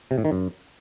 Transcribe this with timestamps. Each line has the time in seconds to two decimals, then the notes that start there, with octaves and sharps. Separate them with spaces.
0.11 C3
0.18 A2
0.25 D#3
0.32 F#2